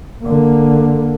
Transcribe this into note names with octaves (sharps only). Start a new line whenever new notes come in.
D3 A#3